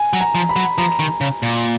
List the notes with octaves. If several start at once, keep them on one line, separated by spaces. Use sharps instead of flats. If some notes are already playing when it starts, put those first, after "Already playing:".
Already playing: G#5
F#3
A#5
F3
B5
F#3
F3 A#5
D#3
C#3
A#2